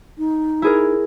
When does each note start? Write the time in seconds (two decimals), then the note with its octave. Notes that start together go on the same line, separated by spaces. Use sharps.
0.18 D#4
0.62 E4 G#4 A#4